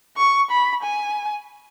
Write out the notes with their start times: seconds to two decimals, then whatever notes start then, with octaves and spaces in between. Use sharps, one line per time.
0.17 C#6
0.50 B5
0.83 G#5